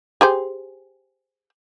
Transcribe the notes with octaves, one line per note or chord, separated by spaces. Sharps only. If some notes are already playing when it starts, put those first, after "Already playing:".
G4 G#4 C5